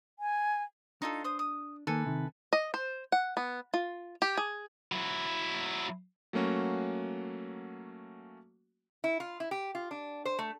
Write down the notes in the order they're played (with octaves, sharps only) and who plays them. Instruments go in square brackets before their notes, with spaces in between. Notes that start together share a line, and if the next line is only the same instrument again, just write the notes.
[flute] G#5
[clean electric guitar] D4 [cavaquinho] D#4 F4 A4
[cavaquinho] C5 D#6
D#6
[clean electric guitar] D#3 A#3 [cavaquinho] A4 B4 G#5
[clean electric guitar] C3 D#3
[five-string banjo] D#5
C5
F#5
B3
F4
G4
G#4
[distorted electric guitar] F#3 E4
[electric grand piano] F#3 A3 A#3 C#4 F#4
[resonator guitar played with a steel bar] E4
F4
E4
G4
F4
D4
C5
A3